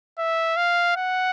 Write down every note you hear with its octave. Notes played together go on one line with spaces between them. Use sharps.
E5
F5
F#5